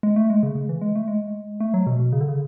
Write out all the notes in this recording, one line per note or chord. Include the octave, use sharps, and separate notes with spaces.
G#3
A3
G#3
C#3
C#3
E3
G#3
A3
G#3
A3
F#3
B2
B2
C#3
D3
C#3